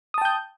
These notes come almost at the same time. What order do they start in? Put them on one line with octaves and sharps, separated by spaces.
D#6 A5 G5 G6